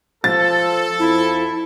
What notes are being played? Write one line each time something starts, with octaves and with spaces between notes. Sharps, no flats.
F3 A4 A6
F2 E4